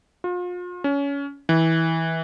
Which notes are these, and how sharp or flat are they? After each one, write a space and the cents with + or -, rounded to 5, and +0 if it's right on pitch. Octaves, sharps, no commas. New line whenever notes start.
F4 +35
C#4 +25
E3 -20